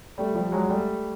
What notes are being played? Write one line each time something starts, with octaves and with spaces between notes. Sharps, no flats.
G3 A3
F3 G3
F#3 G#3
G3 A3